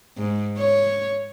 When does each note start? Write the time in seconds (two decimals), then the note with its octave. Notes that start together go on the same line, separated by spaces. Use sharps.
0.18 G#2
0.58 C#5